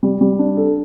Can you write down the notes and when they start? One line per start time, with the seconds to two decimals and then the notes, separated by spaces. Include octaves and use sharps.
0.03 G3
0.21 G3
0.39 D4
0.57 A4